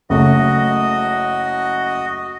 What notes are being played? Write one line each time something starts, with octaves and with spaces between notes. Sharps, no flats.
F#1 A3 F#4 D#5